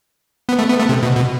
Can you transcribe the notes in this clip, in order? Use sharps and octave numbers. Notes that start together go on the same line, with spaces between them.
B3
A3
B3
A3
C3
B2
B2